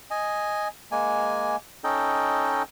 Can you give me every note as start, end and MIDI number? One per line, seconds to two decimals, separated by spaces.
0.11 0.68 75
0.11 0.68 80
0.92 1.56 56
0.92 1.56 58
0.92 1.56 80
1.84 2.63 61
1.84 2.63 63
1.84 2.63 69
1.84 2.63 75
1.84 2.63 79